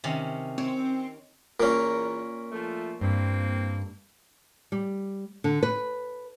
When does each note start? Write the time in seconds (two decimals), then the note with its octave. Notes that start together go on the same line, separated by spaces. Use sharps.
0.04 C3 D#3 C#4
0.58 C4 C#5
1.60 E2 A#2 C#4 A#4
2.52 F3 A3
3.01 G2 A#3 C4
4.72 G3
5.44 D3
5.63 B4